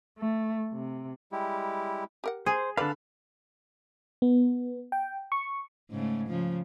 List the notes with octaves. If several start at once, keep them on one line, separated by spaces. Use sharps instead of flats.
A3
C3
G3 G#3 E4 G4
G4 A#4 F#5
G#4 C5
D3 B4 D5 F5 F#5 A5 B5
B3
G5
C#6
G#2 C#3 A3
C#3 F3